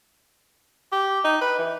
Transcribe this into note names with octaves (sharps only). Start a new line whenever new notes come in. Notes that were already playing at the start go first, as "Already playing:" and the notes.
G4
D#4
B4
E3